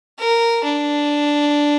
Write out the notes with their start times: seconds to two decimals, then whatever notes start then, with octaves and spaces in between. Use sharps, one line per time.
0.19 A#4
0.64 D4